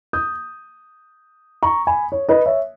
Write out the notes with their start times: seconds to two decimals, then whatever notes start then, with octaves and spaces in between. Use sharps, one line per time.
0.13 D#6 G6
1.63 A#5 C#6
1.87 G#5 B5
2.12 C#5
2.29 B4 D#5
2.46 C#5 E5